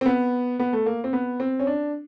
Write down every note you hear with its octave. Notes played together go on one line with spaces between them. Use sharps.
C4
B3
B3
A3
A#3
C4
B3
C4
C#4
D4